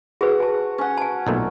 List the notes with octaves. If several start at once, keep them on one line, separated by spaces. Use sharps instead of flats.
F#4 G#4 B4 G#5
G#5 A5
C#4 F#5
G#5 A5
B1 A#2 A3